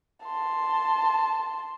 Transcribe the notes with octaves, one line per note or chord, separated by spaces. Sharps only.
A5 C6